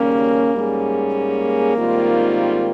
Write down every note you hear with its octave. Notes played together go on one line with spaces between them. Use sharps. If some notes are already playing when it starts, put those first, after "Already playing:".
Already playing: D#2 C#3 G3 A#3 C#4
G#2 G3 C#4 G#4
A#3
G#2 D#3 G3 C4 F4